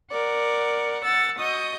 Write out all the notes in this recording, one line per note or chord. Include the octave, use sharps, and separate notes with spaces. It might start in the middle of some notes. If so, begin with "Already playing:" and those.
A#4 D5 F#5
F#5 E6 A6
F#4 D#5 D#6 G6